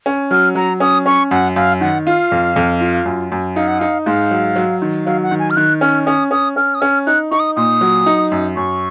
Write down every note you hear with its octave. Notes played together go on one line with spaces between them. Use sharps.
C#4
F#3 F6
F#3 A#5
C#4 D#6
C#4 C#6
F#2 F#5
F#2 F5
D#3 F#5
F4 F5
F2
F2
F4
F#2
F#2
D#4 F5
F#5
D#4 F5
G#2 F5
F#3
F#3
D#3
F#3 F5
F#5
D#3
G#5
F6
D#3 F#6
C#4 F6
C#4 D#6
C#4 D#6
C#4 F6
D#6
C#4 F6
D#4 F#6
D#4 C#6
D#6
A#2 D#6
F#3
D#4
F#2
F#2 C#6